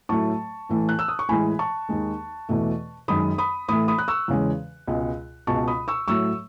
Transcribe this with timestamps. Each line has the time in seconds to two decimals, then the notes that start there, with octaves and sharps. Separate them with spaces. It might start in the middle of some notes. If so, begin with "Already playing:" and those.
0.09 A2 F#3 A3 A5 C#6
0.69 A2 E3 A3
0.89 F#6
0.99 E6
1.08 D#6
1.19 C#6
1.29 A2 E3 G#3 G#5 B5
1.59 A5 C#6
1.89 D#2 D#3 G#3
2.49 E2 B2 A3
3.08 F#2 D#3 G#3 B5 D#6
3.38 B5 D#6
3.68 A2 E3 A3 B5 D#6
3.88 B5 D#6
3.98 F#6
4.08 C#6 E6
4.28 E2 C#3 G#3
4.87 C#2 B2 G#3
5.47 C#2 B2 G#3 A5 C#6
5.67 B5 D#6
5.88 C#6 E6
6.08 A2 F#3 A3 C#6 E6